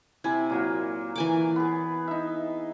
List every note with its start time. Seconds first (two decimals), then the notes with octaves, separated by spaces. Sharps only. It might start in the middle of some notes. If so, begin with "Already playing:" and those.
0.24 C3 E4 G#5
0.50 A#2 F#3 A#3
1.16 E3 G#5 D6
1.56 B3 G#4
2.08 D#4 E5